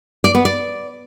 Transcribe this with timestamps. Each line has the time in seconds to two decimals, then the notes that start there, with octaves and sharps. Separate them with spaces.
0.24 D5
0.35 B3
0.45 D5